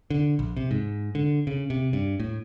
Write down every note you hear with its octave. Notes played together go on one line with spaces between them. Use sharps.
D3
A#1
C3
G#2
D3
C#3
C3
G2
A2